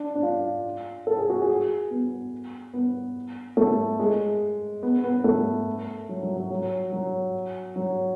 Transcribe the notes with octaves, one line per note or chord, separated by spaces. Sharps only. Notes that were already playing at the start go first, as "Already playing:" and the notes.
Already playing: D4
D4
F4
A4
G#4
F#4
G#4
B3
B3
A3
G#3
B3
B3
A3
F#3
F#3
F#3
F#3
F#3
F#3